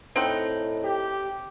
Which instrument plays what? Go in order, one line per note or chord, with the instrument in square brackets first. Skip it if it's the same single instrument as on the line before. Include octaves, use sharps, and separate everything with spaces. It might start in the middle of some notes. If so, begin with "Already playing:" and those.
[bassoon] A2 [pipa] C4 D#4 F#5
[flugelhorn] G4